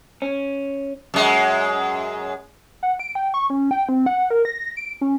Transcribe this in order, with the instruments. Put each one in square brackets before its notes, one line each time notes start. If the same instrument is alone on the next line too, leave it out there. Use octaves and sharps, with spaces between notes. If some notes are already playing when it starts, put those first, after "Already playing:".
[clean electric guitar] C#4
[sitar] F#2 G#3
[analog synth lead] F#5
D7
G5
C#6
C#4
G5
C4
F#5
A#4
A#6
D7
C#4